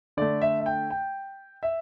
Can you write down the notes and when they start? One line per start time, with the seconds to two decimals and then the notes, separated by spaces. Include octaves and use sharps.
0.17 D3 A3 D5
0.42 E5
0.60 E5
0.66 G5
0.90 G5
1.63 E5